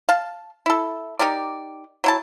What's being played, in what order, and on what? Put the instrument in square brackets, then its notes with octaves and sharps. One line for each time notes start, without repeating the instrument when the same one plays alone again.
[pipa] F5 A5
E4 A4
D#4 G4 A#4 D5
F#3 E4 A5